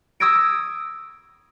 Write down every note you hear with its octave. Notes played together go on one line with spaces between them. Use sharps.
C#6 D#6 E6 G#6 A#6 D7